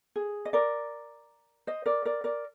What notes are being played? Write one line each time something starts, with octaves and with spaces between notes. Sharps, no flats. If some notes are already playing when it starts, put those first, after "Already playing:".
G#4
D#5
A#4 D5
C5 D#5
A#4 D5
A#4 D5
A#4 D5